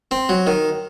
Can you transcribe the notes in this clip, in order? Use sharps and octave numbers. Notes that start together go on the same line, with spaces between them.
C4
F#3
D#3